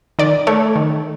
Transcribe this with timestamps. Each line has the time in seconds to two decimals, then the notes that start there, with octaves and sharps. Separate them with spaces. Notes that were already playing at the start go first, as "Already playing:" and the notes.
0.19 D#3 D5
0.47 A3 C#5
0.76 D#3